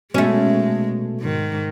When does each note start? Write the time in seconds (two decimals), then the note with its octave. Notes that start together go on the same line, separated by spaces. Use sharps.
0.14 B2 G#3 A3 C#4
1.21 G#2 D#3